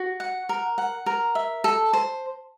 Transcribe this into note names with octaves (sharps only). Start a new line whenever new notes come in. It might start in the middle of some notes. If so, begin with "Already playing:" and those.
Already playing: F#4
F#5
A#4
F#5
A#4
E5
A4
C5